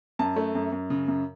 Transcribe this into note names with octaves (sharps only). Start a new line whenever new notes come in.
F#2 A5
A3
F#2
F#2
C#3
F#2